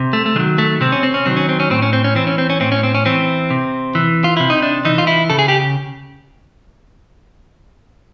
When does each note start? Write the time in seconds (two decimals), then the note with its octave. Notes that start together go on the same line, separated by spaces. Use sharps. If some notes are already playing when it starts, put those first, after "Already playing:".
Already playing: C3
0.13 A3
0.26 A3
0.36 D#3 G#3
0.40 F#3
0.58 A3
0.81 C3 C4
0.92 C#4
1.03 C4
1.14 C#4
1.26 D#3 F#3 C4
1.37 C#4
1.49 C4
1.60 C#4
1.70 A2 C4
1.82 C#4
1.93 C4
2.04 C#4
2.15 E3 C4
2.27 C#4
2.38 C4
2.50 C#4
2.60 A2 C4
2.72 C#4
2.83 C4
2.95 C#4
3.05 E3 C4
3.51 C3
3.95 E3
4.24 F4
4.37 C3 E4
4.50 D#4
4.62 D4
4.85 E3 D#4
4.98 F4
5.07 E4
5.30 C#3 A4
5.39 G#4
5.48 G4